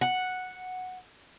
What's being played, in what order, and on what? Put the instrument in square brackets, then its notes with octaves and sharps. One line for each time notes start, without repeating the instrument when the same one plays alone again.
[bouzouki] F#5